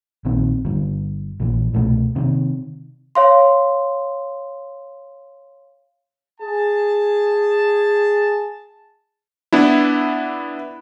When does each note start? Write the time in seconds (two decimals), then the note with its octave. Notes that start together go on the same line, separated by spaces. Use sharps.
0.25 A#1 D#3 C4
0.65 G1 G2
1.40 A#1 E3
1.73 C2 B2 A3
2.16 C3 D#3
3.15 C#5 F5 C6
6.41 G#4 A5
9.53 B3 D4 E4